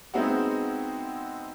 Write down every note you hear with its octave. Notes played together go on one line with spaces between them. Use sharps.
G#3 B3 C4 D#4 E4 F#4